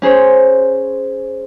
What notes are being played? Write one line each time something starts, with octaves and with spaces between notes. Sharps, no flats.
C#4 G#4 C5 C#5